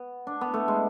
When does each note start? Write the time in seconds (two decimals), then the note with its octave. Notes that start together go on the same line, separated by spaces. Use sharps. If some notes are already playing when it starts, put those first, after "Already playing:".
Already playing: B3
0.27 D4
0.41 B3
0.54 A3
0.68 G#3